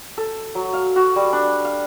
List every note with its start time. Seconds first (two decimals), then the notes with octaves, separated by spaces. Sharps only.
0.18 A4
0.55 F#3
0.73 F5
0.96 F#4
1.16 G3
1.33 D4
1.65 F5